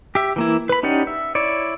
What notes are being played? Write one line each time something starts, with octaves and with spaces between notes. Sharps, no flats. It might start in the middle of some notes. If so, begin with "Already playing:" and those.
G4 E5
E3 A#3 E4
B4 B5
C#4 D#4 G4 D5 F#5
E5
E4 C#5 D5